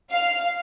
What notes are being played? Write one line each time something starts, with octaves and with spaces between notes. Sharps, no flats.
F5